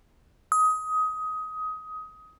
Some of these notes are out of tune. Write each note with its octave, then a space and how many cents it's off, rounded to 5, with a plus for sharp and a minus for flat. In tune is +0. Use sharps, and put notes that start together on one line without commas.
D#6 +20